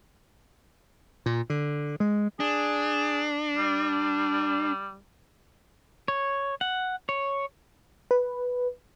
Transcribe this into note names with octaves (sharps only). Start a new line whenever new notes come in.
A#2
D3
G#3
D4 G#4
G3
C#5
F#5
C#5
B4